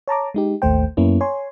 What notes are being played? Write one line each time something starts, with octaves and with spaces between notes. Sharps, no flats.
C#5 A5 A#5 D6
G#3 D#4 G4
A1 D#2 A3 C5 G5
F#2 A#3 B3 C#4 E4
C#5 G#5 C6